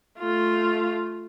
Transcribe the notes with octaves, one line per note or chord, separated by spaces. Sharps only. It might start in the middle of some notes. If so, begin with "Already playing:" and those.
A3 F4